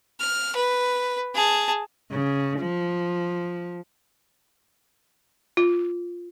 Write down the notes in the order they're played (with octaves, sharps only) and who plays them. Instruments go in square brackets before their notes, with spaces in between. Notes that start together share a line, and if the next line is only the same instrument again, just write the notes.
[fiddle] F6
B4
G#4 A5
[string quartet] C#3
F3
[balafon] F4